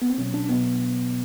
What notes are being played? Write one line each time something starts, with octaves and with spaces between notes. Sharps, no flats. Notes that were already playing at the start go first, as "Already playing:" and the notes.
B3
C4
B2 F#3 C#4
D4
B2 F#3 B3